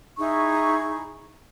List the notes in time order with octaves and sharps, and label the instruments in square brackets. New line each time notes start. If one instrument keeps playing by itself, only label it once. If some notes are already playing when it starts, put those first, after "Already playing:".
[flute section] D#4 E4 G#4 C#6